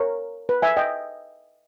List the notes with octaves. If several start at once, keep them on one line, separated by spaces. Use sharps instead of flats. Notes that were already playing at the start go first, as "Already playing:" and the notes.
Already playing: A#4 C#5
B4
E5 G#5
D#5 G5